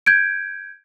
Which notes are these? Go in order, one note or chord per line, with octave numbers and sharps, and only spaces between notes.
G6 G#6 D7